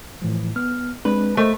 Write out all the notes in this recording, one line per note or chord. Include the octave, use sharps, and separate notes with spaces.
A2 E3 F3
B3 F6
G#3 C4 D4 B4
A3 A#4 C5 D#5